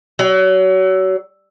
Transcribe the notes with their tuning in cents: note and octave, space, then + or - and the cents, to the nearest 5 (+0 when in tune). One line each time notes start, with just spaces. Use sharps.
F#3 +30